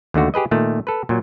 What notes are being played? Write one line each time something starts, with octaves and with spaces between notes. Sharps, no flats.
D#2 D3 A3 F#4
G4 G#4 B4 D#5
A#2 D#3 A3
A4 B4
A#2 F#3